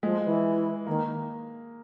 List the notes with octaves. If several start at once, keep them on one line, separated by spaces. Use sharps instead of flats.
F3 G#3
E3
D#3 A#3